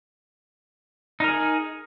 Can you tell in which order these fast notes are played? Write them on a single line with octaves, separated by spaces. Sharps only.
D#4 A#4 G#4